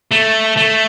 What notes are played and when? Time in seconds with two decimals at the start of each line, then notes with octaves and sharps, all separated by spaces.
0.11 A3
0.57 A3